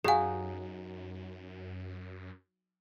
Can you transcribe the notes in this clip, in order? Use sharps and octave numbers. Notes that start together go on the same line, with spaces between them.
F#2 F#3 D#4 G4 G#4 F5 G#5